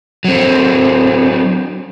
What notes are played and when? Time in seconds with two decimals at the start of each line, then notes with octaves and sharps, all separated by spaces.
0.24 F#3 C4